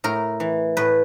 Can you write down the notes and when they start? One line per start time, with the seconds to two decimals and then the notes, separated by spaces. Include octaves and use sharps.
0.04 A2 A#4
0.40 E3
0.77 A2 B4